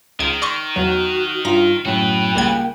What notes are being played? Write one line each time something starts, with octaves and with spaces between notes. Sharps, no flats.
C#2 D#3 G#6
D5 C6 C#6
E2 F#3 F#4
G2 F4 A#5
F#2 A2 F#3 F#4 B4 G5
C#2 G3 A#3 G#6